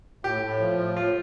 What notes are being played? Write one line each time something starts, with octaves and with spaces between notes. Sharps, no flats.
A2 G4
A2
F3
A2
A2 F4